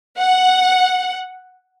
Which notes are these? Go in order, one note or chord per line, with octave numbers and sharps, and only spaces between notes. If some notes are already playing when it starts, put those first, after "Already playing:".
F#5